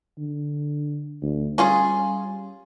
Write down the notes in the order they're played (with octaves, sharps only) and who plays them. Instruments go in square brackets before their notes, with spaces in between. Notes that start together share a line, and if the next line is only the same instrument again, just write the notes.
[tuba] D3
D2
[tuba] G3 [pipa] C#4 F4 G#4